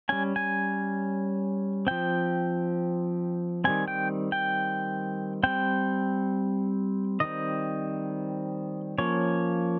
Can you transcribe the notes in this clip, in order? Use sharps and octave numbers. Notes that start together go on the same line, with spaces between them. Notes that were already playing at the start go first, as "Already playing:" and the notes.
G3 C#4 G#5
G#5
F3 C4 G5
D#3 G3 C4 G#5
G5
G5
G3 C4 G5
D#3 G3 C4 D#5
F3 A#3 C#4 C#5